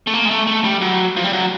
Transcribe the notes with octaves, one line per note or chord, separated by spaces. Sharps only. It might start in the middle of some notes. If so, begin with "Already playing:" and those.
A3
A#3
G#3
A3
A3
G3
F#3
F3
G3
F#3